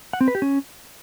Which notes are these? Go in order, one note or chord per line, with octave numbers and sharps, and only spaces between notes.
F#5
C4
B4
G4
C#4